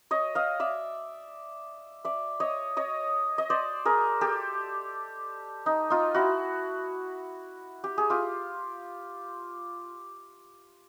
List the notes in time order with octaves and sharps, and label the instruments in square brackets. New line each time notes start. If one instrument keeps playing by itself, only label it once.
[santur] C#5 D#5
D#5 F5
D5 E5
D5 E5
C#5 D#5
C#5 D#5
D#5
C5 D5
G#4 A#4
G4 A4
D#4
D#4 F4
E4 F#4
G4
G#4
F4 G4